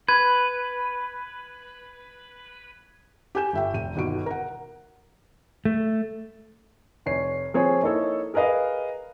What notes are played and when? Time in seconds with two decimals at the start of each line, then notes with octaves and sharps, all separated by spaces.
0.08 B4 G#6
3.35 G4 A4 G#5 G6 E7
3.53 G1 E5 G5
3.74 F1 D#7
3.95 G1 D#2 B2 D7
4.26 A#4 F#5
5.65 A3
7.06 F1 C#5 C7
7.54 F3 C4 G#4 C5 C#5
7.82 A#3 D#4 E4 A4 C#5
8.34 G#4 A#4 B4 D#5 F5